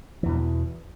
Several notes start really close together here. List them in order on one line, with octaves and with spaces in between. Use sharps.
E3 E2 B2